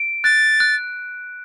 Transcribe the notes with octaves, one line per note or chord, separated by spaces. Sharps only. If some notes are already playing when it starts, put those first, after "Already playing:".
Already playing: D7
F#6 A6
F#6